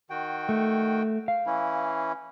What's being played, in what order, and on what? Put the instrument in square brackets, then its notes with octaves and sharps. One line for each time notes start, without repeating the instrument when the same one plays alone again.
[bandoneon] D#3 F#4 G5
[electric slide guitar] A3
F5
[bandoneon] E3 C#4 E4